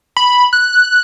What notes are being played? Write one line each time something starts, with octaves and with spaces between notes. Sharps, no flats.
B5
F#6